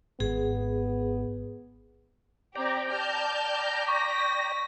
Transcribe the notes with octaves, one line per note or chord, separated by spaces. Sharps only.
G#1 B3 G#4
C4 G4 D5 G5 A#5
A5 F6 G6
C#6 A#6 B6